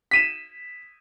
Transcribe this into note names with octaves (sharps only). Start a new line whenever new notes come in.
B6 D#7 E7